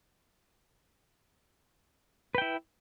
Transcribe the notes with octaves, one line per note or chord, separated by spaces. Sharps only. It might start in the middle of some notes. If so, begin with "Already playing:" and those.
E4 B4 G5